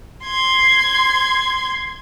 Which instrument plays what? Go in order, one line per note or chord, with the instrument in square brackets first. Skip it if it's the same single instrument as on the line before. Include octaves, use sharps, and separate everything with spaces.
[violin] C6 G#6